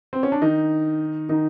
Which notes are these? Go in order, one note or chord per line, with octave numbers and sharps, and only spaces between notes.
C4
C#4
D4
D#3 D#4
D#3 D#4